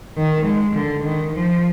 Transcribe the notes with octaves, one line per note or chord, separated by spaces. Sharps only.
D#3
G#3
D3
D#3
F3